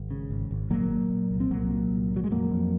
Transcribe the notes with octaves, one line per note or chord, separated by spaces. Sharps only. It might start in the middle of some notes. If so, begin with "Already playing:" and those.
Already playing: G#1
C#3
G#1
G#1
A#2 F#3 A#3
A#2
A#2
C2
C4
C2 F#3 A#3
A#2
C2
A#2
F#3
G#3
F2 F#3 A#3
F2